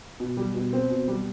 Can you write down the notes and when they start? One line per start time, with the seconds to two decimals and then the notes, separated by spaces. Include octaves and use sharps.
0.20 B2
0.37 G3
0.55 B2
0.73 C4
0.90 B2
1.08 G3